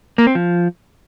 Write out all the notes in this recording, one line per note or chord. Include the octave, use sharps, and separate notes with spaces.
A#3
C4
F3